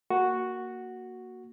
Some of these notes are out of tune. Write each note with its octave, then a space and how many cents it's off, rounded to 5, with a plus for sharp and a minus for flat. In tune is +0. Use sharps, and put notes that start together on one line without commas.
A#3 +0 F#4 +0